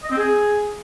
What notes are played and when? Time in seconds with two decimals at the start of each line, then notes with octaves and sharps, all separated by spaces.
0.03 D#5
0.10 C4
0.18 G#4